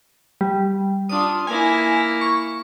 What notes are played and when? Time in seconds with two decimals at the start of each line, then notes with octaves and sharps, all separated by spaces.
0.41 G3
1.09 D4 F4 D#6
1.47 A#3 E4 G#5
2.21 C#6